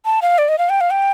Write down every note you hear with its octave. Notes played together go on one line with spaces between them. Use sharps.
A5
F5
D5
D#5
F5
G5
F5
G5